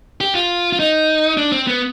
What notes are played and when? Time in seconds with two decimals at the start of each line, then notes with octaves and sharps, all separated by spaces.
0.21 G4
0.35 F4
0.73 F4
0.79 D#4
1.37 D4
1.52 C4
1.67 B3